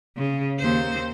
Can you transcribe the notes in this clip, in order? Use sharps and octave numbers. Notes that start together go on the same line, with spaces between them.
C#3
D#2 C5